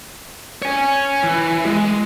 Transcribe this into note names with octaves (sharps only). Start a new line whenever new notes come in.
C#5 G#5
E3
G#3